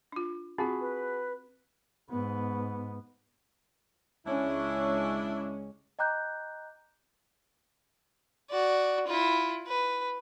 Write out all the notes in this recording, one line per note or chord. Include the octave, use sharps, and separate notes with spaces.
D4 F4
C4 F4 F#4 G#4 B5
B4
G#2 B3
C#2 G#3 C#4 D4 E4
D#5 G5 A#5 D6 F#6 G6
F#4 D5
E4 F4
B4